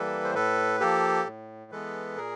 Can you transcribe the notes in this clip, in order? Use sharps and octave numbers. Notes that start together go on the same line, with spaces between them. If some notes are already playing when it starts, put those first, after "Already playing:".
Already playing: E3 G3 A#3 A4 B4
C5
A2 A4 B4
F3 A#3 G4 A4
A2
E3 G#3 B3 A4 B4
A#2 G#4 A#4